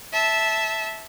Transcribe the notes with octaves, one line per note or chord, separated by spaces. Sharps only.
E5 A5